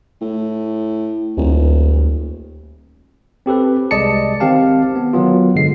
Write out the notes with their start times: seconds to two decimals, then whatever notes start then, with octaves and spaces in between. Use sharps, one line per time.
0.21 A2
1.37 D#1 D2
3.46 C4 G4 A4 B4
3.91 C2 G#3 D5 D#5 A5 C#7
4.40 D#3 C4 G4 F5 A5
4.96 B3
5.13 D#3 F#3 B3 F4
5.55 G1 D3 G#3 C7